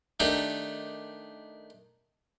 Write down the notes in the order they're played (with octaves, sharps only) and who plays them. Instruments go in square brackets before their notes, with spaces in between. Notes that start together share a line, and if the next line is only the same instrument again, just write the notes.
[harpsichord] D#3 A3 D4 G4 D5